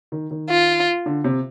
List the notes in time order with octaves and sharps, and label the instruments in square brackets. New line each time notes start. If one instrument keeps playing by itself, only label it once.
[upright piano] D#3
D#3
[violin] F4
[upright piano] D3
C3